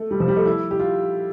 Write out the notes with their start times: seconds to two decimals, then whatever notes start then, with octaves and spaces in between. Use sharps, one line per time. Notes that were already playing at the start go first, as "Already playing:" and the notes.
Already playing: A3
0.11 G3
0.20 F3
0.28 G3
0.36 A3
0.45 E4
0.71 G4
0.79 F4